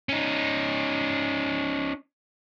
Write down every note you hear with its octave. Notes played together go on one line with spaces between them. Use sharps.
C#4 D#4